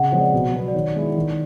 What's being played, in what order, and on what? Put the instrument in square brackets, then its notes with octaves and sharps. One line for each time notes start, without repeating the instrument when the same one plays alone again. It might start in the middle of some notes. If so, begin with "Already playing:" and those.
Already playing: [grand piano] C#3 [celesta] D#5 F#5
[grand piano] F3 G#3 C4 [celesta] C#5
[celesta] D5
[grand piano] B2
F#3 B3
[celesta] D5
[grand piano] D#3 [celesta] C#5
[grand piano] G#3 B3 E4
D#3